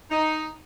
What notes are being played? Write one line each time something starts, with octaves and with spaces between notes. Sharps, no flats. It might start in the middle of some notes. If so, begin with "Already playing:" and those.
D#4